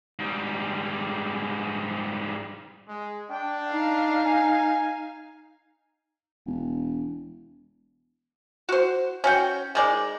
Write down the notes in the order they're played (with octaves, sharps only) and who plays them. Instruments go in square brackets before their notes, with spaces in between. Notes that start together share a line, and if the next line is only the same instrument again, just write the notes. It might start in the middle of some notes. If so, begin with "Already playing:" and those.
[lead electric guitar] G#2 G3
[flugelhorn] G#3
[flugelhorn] D4 [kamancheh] G5
[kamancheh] D#4 F5
[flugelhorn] G#5
[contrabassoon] E1
[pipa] F#4 C5
C#4 F#4 G5
D#3 G#3 D5